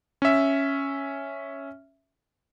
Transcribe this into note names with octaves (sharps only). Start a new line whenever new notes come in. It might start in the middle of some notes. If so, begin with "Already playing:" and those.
C#4 E5